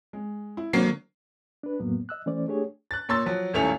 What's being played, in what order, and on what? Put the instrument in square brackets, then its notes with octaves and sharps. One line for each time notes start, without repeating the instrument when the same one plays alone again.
[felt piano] G#3
E4
[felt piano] G#1 D3 C5 [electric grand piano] F#3 A#3 C7
[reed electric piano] D4 B4
F2 A2 F#3 A#3 B3
D#5 E6 F#6
E3 A3 C#4 C5 D5
A3 D4 G4 G#4 C#5
[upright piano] F#6 A6
A#2 C#5 C6 E6 A6
F3 F#3
D#1 G#1 A3 C#4 E4 F7